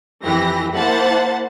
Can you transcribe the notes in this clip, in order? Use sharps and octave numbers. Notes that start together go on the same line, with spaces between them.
F2 E3 G4 B5 A#6
A#3 E4 C5 F#5 A5 A6